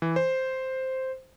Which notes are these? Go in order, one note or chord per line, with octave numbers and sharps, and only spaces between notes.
E3
C5